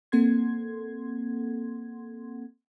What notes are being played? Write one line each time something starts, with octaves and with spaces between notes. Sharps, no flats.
A#3 C4 A4 F#5 C6 G#6